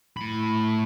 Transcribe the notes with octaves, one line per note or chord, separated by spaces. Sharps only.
A2 B5